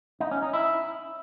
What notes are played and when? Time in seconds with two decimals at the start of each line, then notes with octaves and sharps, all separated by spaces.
0.20 D#4
0.31 C#4
0.42 D#4
0.53 E4